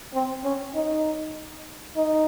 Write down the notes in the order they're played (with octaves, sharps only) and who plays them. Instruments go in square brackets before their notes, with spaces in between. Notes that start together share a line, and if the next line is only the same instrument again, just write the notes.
[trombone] C4
C#4
D#4
D#4